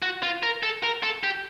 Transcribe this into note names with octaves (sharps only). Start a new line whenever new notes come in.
F#4
F4
A#4
A4
A#4
A4
G4